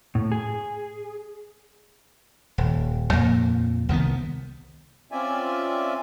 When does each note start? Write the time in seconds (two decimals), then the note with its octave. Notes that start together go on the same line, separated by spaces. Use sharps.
0.15 A2
0.32 G#4
2.58 D#1
3.13 F2 A#2 A#3
3.89 C2 D#3 G3 B3
5.12 C4 C#4 F4 D5 E5 G#5